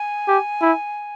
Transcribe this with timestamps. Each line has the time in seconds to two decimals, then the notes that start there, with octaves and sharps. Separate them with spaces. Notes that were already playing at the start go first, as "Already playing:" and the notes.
Already playing: G#5
0.28 G4
0.62 E4